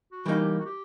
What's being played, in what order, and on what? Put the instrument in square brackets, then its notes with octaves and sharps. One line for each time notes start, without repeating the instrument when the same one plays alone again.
[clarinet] F#4
[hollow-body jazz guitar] E3 G3 A#3 D#4
[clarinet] G4
F#4
G4